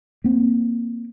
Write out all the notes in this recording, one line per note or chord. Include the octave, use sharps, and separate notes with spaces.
A#3 C4